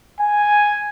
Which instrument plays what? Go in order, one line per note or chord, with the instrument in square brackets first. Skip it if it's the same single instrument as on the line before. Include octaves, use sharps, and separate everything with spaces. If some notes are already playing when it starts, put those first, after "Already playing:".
[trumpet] G#5